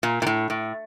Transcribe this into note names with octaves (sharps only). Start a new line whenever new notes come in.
A#2
A#2
A2
A2